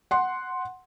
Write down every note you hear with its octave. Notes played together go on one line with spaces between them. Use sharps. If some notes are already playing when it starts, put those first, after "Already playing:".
F#5 C6